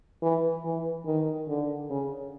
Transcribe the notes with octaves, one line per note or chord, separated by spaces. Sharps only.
E3
E3
D#3
D3
C#3